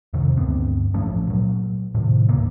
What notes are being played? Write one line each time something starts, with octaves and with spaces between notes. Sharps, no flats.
F2 C3 D#3
D2 G2 B3 C4
A1 F3 A3 C#4
A#2 F#3
A2 C3 D#3
D2 G#2 C#3 A#3